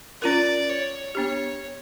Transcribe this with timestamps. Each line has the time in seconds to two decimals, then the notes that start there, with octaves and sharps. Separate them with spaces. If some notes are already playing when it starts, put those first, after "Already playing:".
0.21 C#4 F4 A#4 D5
0.69 C#5
1.15 B3 D4 G4 C#5